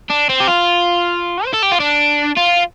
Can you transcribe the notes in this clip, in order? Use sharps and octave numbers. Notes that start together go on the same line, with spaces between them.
D4
C4
G4
F4
C5
A4
G4
F4
D4
F4